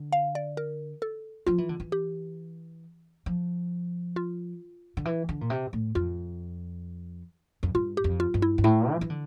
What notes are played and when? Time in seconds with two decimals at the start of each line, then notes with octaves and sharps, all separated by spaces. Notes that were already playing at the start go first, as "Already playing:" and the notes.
Already playing: D3
0.12 F5
0.35 D5
0.57 A#4
1.02 A4
1.47 F3 F4
1.58 E3
1.69 D3
1.80 E3
1.92 G4
3.26 F3
4.16 F4
4.97 D3
5.05 E3
5.29 D3
5.41 A#2
5.50 C3
5.73 A2
5.95 F2 F4
7.63 F2
7.75 G2 F4
7.97 G4
8.04 F2
8.20 F4
8.34 G2
8.42 E4
8.58 G2
8.64 A2 E4
8.93 F3
9.01 E3
9.10 D3